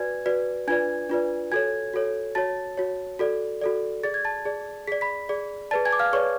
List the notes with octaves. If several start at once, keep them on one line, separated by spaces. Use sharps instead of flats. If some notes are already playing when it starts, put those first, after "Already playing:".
Already playing: F#4 B4 D5 G#5 G#6
F#4 B4 D5
D4 F4 B4 D5 G#5 G#6
D4 F4 B4 D5
F#4 A4 C#5 G#5 G#6
F#4 A4 C#5
F#4 C#5 A5 A6
F#4 C#5
F#4 A4 D5
F#4 A4 D5
G#4 D5 A6
G#6
A5 A6
G#4 D5
G#4 D5 B6
B5 B6
G#4 D5
G#4 B4 D5 A5 A6
G#5 G#6
D6
F5 F6
G#4 B4 C#5 D5 C#6